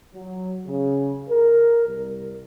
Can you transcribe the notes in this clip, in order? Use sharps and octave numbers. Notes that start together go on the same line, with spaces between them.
F#3
C#3
A#4
C2